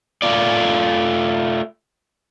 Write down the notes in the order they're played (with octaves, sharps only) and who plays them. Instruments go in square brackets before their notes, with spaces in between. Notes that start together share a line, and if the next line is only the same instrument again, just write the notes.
[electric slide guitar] A3 F4 D5